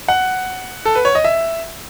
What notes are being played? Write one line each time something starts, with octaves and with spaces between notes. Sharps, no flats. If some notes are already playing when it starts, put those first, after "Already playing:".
F#5
A4
B4
C#5
D#5
E5